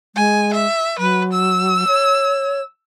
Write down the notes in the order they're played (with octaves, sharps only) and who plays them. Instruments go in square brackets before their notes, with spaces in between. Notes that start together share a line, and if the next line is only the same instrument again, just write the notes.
[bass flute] G#3 [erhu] G#5
[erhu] E5
[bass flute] F#3 [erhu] B4
[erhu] E6
[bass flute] C#5